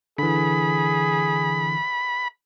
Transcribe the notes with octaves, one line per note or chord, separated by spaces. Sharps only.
D3 E3 G#4 B5